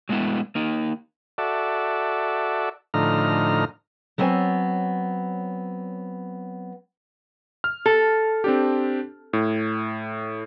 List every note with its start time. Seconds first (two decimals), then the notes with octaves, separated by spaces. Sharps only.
0.09 F#3 G#3 A3 B3 E4
0.55 A#3 D#4
1.38 F#4 A4 D5 E5
2.94 A2 D3 F3 D#4 A#5 F6
4.18 F#3 B3 C4 C#5 G#5
7.64 F6
7.86 A4
8.44 C4 D4 G4
9.33 A2